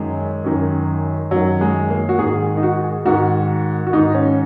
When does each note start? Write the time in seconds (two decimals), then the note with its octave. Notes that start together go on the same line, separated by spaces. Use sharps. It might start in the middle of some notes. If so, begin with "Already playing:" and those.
Already playing: F#2 D#3 G#3
0.44 F#2 D#3
1.31 F#2 D#3 F#3
1.61 G#3
1.90 A#3
2.09 F#4
2.19 G#2 D#3 G#4
2.57 D#4
2.63 F#4
2.84 G#4
3.05 G#2 D#3 F#4
3.87 F#4
3.93 G#2 D#3 D#4
4.15 C#4